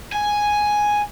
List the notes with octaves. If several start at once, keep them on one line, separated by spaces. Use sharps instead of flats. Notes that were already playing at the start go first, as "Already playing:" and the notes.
G#5